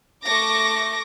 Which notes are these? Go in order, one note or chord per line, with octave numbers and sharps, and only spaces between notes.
A3 C#6 D6 A#6